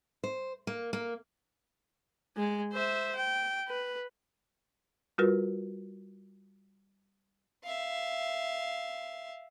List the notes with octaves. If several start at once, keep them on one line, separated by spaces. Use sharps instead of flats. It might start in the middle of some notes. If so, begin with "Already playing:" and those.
C5
A#3
A#3
G#3
C5 E5
G5
B4
G3 F4 F#4 A#4 B4
E5 F5